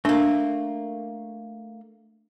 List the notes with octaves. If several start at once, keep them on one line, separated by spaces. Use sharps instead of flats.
A3 A#3 D4